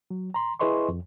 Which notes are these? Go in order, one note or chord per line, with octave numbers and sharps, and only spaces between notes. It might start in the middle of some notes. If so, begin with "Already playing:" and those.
F#3
A#5 C6
E4 G#4 B4 D#5 C6 C#6
F2